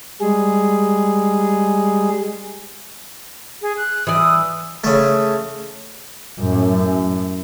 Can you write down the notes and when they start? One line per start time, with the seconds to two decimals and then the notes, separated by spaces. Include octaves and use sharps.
0.21 G3 G#3 G#4
3.62 G#4
3.77 F#6
4.07 E3 D5 D#6
4.84 C#3 A3
6.40 F#2 A2